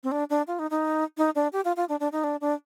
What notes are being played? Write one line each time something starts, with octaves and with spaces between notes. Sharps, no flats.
C4
D4
D4
F4
D#4
D#4
D#4
D4
G4
F4
F4
D4
D4
D#4
D4
D4